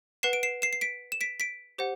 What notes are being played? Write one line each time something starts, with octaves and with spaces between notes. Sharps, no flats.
B4 F#5 C7 E7
D7
C7 E7
C7 E7
C7
B6 D7
E7
B6 D7
B6 D7
G4 C5 F#5